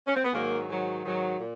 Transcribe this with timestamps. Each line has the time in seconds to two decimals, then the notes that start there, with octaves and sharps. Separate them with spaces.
0.07 C#4
0.16 C4
0.25 B3
0.33 G#2 D#3 F#3 A#3
0.69 G#2 D#3 F#3
1.05 G#2 D#3 F#3
1.40 A#2